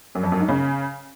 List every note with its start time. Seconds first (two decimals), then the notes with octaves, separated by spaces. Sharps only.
0.15 F#2
0.23 F2
0.32 F#2
0.40 G#2
0.49 C#3